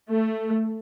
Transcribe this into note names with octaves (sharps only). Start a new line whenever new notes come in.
A3